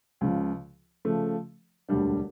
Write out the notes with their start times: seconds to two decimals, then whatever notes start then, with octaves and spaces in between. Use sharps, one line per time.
0.21 C#2 C#3 F3
1.05 C#3 F3 A3
1.89 E1 D2 D3 G3 D4